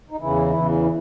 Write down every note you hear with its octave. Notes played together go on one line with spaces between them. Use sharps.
D#4
E2 C#3 E3 E4
E2 C#3 E3